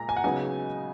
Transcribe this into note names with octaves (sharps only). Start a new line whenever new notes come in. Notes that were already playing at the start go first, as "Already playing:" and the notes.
Already playing: A#2 G#3 A#5
G#5
F#5
C#3 F#3 B3 D#4 G#5